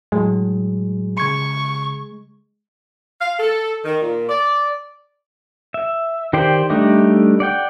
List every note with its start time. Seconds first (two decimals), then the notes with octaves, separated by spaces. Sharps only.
0.12 A2 F#3 G#3
1.18 C#3 C#6 G#6 C#7
3.21 F5
3.39 A4
3.85 D#3
4.01 A#2
4.29 D5
5.74 E5
6.33 D#3 G4 C5 D5 G5
6.70 G3 A3 D4 D#4 G4
7.40 D5 F#5 G5